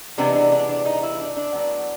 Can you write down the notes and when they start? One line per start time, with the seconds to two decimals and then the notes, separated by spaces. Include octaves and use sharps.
0.18 C3 E3 G#3 B3 D4
0.35 D4
0.52 D4
0.69 D4
0.86 D#4
1.03 E4
1.20 D4
1.36 D4
1.54 A2 F#3 B3